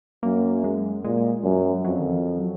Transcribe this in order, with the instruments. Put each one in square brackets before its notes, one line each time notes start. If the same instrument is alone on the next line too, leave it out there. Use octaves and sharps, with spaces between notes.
[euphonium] F#2 [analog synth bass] A#3
[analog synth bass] G#3
[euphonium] A#2 [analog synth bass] G#3
[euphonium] F#2
[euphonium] F2 [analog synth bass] F#3
[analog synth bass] D#3
F3
F#3